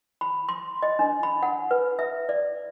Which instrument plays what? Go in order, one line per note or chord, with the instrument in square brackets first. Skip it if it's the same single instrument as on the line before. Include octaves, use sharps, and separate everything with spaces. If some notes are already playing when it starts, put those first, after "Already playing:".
[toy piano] B5
C6
D#5
D4
B5
F#5
B4
E5
D5